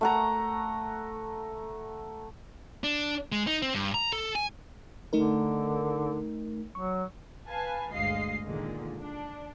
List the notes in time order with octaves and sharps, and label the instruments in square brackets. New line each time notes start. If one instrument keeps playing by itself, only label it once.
[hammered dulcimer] A3 F#5 A#5
[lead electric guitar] D4
G#3
D#4
C4
G2
A#5
A4
G#5
[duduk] D3 [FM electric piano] A3 D#4 A#4
[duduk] F#3 [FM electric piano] C#6
[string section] B4 F5 G#5 A5
G1 D2 G#3 D#5 F5 C7
A#2 D3 D#3 G#3 A#3
D4